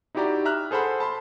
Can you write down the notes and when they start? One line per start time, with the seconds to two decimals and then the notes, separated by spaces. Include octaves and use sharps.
0.15 D#4 E4 F#4 G4 D5 A#5
0.45 E5 A#5 F6 F#6
0.71 G#4 A4 C5 F#5 B5
1.00 A5 B5 C6